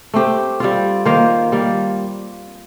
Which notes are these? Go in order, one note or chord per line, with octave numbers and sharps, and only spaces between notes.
A3 C4 G4
G3 C4 F4
D#3 A#3 F4 C5
G3 A#3 F4